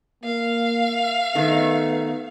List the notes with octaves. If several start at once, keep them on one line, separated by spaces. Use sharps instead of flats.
A#3 F5
D#3 A3 B3